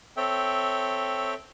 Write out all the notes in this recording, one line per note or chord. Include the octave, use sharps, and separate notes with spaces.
C4 A4 C#5 E5 G5